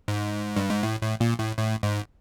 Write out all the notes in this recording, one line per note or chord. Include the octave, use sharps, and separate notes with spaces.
G#2
G2
G#2
A2
A2
A#2
A2
A2
G#2